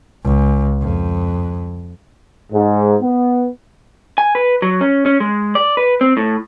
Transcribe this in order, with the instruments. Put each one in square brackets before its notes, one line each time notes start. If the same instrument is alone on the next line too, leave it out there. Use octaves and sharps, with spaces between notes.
[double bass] C#2
F2
[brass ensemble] G#2
B3
[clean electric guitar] G#5
B4
F#3
C#4
C#4
G#3
D5
B4
C4
A2